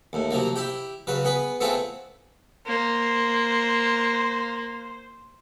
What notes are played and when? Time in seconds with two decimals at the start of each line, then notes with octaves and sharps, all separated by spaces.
0.13 D#2 A2
0.31 C3 F3 F#3 A#3
0.56 E4 G4 G5
1.07 C#3 F#3 B4
1.25 B3 G#4 B4
1.60 A3 B3 C4 E4 F4 G#4
2.67 A#3 C5